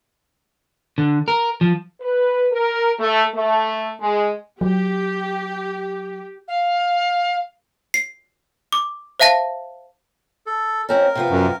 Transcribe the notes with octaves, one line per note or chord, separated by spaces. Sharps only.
D3
A#4
F3
B4
A#4
A3
A3
G#3
F#3 G4
F5
C7
D6
C5 E5 F5 A5 A#6
A4
F2 C4 C#4 A#4
C3 F3 B3
F#2